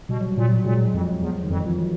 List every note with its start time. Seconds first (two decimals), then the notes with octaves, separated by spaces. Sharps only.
0.09 B2 G3
0.20 F#3
0.32 G3
0.37 A#2
0.52 F#3
0.64 A#2 G#3
0.74 G3
0.84 F#3
0.93 F2 F3
1.21 E2
1.44 D#3
1.50 F2
1.55 E3
1.67 F3
1.78 F#3